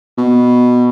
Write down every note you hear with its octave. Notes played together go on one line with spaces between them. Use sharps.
B2